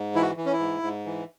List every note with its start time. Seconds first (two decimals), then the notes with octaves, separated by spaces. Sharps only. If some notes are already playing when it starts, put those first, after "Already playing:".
Already playing: G#2
0.15 E3 E4
0.22 F#4
0.37 E3
0.46 C#4
0.53 E4
0.59 G#2
0.83 G#2
1.06 E3